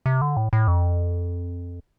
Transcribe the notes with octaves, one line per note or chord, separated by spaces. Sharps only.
C3
D3
A2
A2
F2